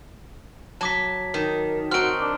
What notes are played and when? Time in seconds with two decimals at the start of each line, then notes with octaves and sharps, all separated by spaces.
0.81 F#3 A5 D6 B6
1.34 D#3
1.91 C4 D#4 F#4 F6 D7
2.20 D4